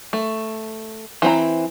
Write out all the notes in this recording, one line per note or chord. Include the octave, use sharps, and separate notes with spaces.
A3
E3 C4 A#5